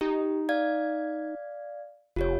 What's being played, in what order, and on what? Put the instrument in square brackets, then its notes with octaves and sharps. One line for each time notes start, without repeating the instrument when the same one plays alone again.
[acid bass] D#4 [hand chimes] G4
[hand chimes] D5 F5 G#6
[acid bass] F1 [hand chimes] F4 G4 C#5